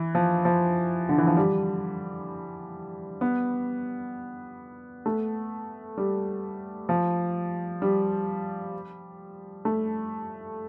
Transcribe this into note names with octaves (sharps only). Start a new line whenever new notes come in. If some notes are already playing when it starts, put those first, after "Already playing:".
Already playing: E3
F3
F3
D3
E3
F3
G3
B3
A3
G3
F3
G3
A3